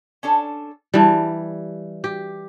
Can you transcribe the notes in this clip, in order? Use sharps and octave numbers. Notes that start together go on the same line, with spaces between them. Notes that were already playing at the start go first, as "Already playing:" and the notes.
C#4 D4 A4
E3 G3 A5
G4